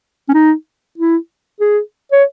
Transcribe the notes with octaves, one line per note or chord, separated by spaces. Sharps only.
C#4
D#4
E4
G#4
C#5